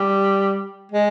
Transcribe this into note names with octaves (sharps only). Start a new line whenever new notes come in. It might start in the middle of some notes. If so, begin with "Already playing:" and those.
Already playing: G3
G#3